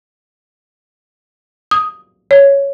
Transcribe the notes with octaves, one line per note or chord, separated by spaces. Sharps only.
D#6
C#5